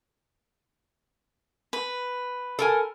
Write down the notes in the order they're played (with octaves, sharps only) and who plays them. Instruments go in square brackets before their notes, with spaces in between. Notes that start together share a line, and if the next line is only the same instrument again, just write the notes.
[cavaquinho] B4
[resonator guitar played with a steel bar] A4 A#4 G#5